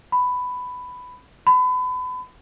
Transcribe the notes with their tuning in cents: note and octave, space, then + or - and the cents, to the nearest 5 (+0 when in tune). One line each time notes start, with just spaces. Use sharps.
B5 +10
B5 +30